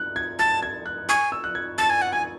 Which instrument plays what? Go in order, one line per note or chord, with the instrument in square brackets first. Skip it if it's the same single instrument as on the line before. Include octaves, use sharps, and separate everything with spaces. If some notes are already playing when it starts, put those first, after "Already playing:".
Already playing: [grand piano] F#6
G#6
[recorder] A5 [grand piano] A6
[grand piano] G#6
F#6
[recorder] G#5 [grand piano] C#6
[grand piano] E6
F#6
G#6
[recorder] A5 [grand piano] A6
[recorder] G#5
F#5
[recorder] G#5 [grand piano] G#6